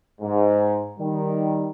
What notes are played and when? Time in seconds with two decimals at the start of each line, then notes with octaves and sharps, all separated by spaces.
0.21 G#2
0.98 D#3 G3